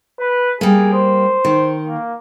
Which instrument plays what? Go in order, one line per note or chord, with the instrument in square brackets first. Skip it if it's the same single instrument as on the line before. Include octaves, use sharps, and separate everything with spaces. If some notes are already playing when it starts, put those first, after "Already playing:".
[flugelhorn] B4
[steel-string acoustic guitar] G3 A#3 [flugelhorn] G#4
[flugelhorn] C5
[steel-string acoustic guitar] D#3
[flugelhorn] A#3